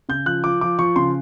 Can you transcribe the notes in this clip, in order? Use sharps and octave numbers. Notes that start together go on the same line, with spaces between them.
C#3 G6
F3 F#6
F3 D6
F3 D6
F3 C#6
C#3 C6